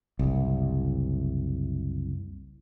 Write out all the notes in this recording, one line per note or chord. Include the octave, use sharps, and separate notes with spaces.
F#1 C2